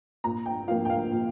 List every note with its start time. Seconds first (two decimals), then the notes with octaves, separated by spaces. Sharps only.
0.24 A#2 A#5
0.46 G5
0.68 F3 A#3 F5
0.85 G5
0.90 F5
1.12 A#2